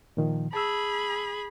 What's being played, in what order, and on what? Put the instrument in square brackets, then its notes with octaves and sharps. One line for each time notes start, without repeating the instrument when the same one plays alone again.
[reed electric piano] A#2 D#3 F3
[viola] G#4 B5 [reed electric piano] A5 E6